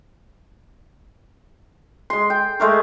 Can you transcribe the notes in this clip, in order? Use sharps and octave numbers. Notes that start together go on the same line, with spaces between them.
G#3 C6
G5
G#3 A3 A#4